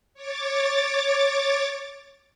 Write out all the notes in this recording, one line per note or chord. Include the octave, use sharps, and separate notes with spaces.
C#5 D6 A6